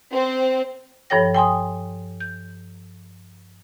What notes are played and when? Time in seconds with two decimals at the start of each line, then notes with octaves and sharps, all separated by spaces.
0.12 C4
1.10 G2 F3 A4 C#5 G5 A#6
1.35 G5 G#5 C6 D#6
2.20 G6